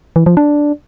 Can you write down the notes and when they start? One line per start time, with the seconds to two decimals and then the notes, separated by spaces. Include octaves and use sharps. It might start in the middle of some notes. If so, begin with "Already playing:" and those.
0.16 E3
0.26 F3
0.37 D4